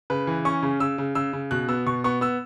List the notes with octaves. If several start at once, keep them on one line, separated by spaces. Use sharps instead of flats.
C#3 B4
E3
C#4 C#6
C#3
C#3 E6
C#3
C#3 E6
C#3
B2 F#6
B3 E6
B2 C#6
B3 C#6
B3 E6